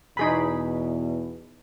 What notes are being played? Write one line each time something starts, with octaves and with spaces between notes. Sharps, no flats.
E2 B2 D#4 G#4 B5